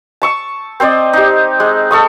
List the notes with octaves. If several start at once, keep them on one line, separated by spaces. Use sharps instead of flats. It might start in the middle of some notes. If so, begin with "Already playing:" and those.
A5 C#6 E6
C4 C5 D5 D#5
D#4 G4
G#3
A4 C#6 D#6